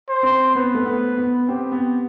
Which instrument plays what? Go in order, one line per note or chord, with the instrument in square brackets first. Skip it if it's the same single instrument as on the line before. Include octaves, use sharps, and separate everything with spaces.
[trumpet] C5
[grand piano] C4
[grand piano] B3 [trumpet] B4
[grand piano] A3
B3
B3
[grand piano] C4 [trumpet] G4
[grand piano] B3